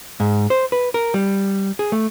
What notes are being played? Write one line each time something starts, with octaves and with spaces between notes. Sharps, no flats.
G#2
C5
B4
A#4
G3
G#4
A3